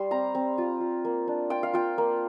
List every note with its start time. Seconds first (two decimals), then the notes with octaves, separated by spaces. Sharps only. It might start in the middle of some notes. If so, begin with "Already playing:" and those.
Already playing: G3 C6
0.11 C4 A#5
0.35 C4
0.58 F4
0.80 F4
1.05 A#3
1.28 D4
1.50 F4 G5
1.63 F5
1.73 F4 G5
1.98 A#3